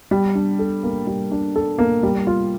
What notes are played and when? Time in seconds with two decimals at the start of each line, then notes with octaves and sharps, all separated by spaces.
0.11 G3
0.35 D4
0.59 A4
0.83 A#3
1.07 G3
1.31 D4
1.56 A4
1.78 A#3
2.03 G3
2.27 F4